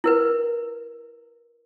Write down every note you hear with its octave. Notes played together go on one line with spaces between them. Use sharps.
E4 A#4 B4